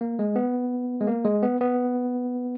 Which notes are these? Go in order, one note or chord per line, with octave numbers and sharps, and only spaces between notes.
A#3
G#3
B3
G#3
A#3
G#3
B3
B3